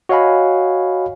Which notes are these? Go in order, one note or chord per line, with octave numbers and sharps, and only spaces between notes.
F#4 C#5 D#5 F5 G#5 B5